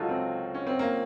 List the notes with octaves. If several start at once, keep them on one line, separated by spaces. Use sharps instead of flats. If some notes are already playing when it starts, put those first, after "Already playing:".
Already playing: C#2 C#3 F#3 D#4 F4 F#4 A4
C4
C#4
C4
A#3